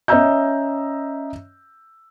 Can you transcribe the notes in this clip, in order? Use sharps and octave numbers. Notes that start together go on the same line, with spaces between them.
C#4 D#5 E5 A#5 E6 G6